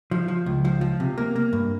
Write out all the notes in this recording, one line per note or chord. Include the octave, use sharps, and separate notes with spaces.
F3
F3
C#2
F3
F3
C3
A#3
A#3
G2